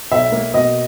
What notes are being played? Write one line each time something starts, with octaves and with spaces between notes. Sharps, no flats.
B1 E5
A#3
B2 D#5